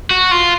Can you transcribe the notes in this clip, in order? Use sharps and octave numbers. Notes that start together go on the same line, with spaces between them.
F#4
F4